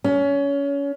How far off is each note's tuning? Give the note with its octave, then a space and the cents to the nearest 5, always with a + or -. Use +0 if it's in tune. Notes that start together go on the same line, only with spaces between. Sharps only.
C#4 +25